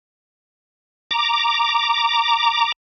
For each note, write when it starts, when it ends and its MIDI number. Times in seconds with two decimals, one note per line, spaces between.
1.11 2.72 82
1.11 2.72 86